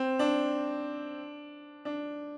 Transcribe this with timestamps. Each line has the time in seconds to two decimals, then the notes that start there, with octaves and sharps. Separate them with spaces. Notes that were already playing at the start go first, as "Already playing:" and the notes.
Already playing: C4
0.19 D4
1.85 D4